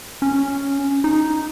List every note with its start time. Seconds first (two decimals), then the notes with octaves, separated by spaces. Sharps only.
0.22 C#4
1.04 D#4